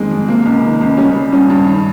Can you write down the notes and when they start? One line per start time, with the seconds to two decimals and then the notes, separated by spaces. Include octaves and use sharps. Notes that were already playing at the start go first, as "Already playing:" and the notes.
Already playing: F2 D#3 G#3 C4
0.11 F2
0.28 C3 A#3
0.46 C#2
0.64 D#3
0.81 C#2
0.97 C#3 G3 C#4
1.15 G3
1.32 G2 C#3 C#4
1.50 G2
1.67 D#3